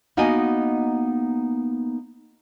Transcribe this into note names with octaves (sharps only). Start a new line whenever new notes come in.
A#3 B3 D#4 F#4 D#5 G#5